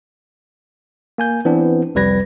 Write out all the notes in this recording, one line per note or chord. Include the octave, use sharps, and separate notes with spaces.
A#3 G#5 G6
E3 B3 C4 D4
C2 F2 G3 B4 G#6 A#6